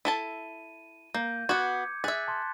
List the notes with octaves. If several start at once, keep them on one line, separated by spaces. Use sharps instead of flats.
E4 A4 A5 D#7
A#3 G6
B3 F#4 D6 G#6 C#7
G#4 E5 F#6 A6 B6
A5 C6